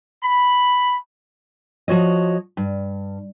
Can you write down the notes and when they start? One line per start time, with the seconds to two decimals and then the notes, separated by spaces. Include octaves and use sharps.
0.24 B5
1.88 F3 F#4 C#5 D#5
2.57 G2